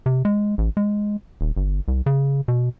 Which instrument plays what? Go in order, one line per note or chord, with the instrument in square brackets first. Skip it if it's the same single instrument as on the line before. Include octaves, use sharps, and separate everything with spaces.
[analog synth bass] C3
G#3
A1
G#3
D#1
G1
C2
C#3
B2